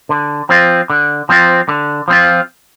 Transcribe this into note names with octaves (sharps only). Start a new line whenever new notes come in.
D3
F3 C4 F4
D3
F3 C4 F4
D3
F3 C4 F4